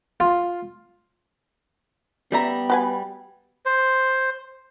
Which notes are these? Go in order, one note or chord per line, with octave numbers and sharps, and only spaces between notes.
F4
G3 B3 E5 A#5
F#4 B4 G#5
C5